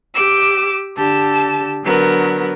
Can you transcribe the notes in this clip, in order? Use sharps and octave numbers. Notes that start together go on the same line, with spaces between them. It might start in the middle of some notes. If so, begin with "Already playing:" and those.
G4 D6 E6
D3 G4 A5 E6
D3 F#3 B3 A#4